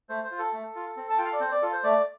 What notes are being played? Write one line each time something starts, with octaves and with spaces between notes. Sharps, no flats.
A3 C5
C5
F4
A4
A3
F4
C4
A5
F4 G5
F5
D5
C4 C5
D5
F4 A4
C5
A3 D5